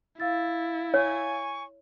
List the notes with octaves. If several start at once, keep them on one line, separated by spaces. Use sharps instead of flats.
E4 F5 E6 A6
C#5 G#5 C#6